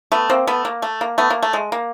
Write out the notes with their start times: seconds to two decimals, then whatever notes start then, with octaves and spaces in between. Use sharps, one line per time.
0.12 A3 B3
0.30 A#3 C4
0.47 A3 B3
0.65 A#3
0.82 A3
1.01 A#3
1.18 A3 B3
1.30 A#3
1.42 A3
1.53 G#3
1.72 A#3